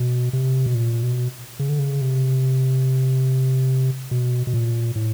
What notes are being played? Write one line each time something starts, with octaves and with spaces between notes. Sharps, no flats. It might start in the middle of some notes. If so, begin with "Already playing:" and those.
Already playing: B2
C3
B2
A#2
B2
C#3
D3
C#3
C3
B2
B2
A#2
A2